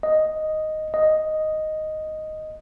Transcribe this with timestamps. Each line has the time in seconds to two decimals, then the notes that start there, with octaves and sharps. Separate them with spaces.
0.03 D#5
0.94 D#5